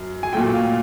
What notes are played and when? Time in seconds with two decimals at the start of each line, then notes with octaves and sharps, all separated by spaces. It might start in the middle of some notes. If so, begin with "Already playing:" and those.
Already playing: F#2
0.23 G#5
0.33 A#2 F#3 A3 G5
0.54 F5